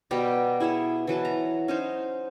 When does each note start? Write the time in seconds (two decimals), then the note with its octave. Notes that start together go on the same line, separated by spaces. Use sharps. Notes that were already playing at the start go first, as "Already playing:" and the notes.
0.11 B2 G3 G4 A#5
0.60 E4 G#4 C#5 E5
1.07 E3 F#3 B4 A5
1.25 A#5
1.68 C#4 D#4 C5